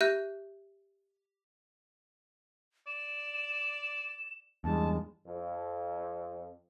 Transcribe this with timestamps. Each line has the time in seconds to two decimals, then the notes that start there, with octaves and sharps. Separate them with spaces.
0.01 G4 E5 F#6 G6
2.87 D5 E7
4.64 E2 G2 G#3 A5
5.26 F2